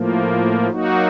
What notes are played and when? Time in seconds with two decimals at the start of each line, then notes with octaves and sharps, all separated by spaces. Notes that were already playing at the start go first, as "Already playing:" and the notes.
Already playing: A2 F3 A#3
0.70 F#3 A#3 D#4 F#4